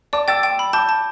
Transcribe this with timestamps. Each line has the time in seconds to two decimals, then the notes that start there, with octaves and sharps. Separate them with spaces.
0.13 D5 A5 D6
0.28 G5 E6 A6
0.43 G5
0.59 B5
0.73 A5 D6 G6
0.89 A5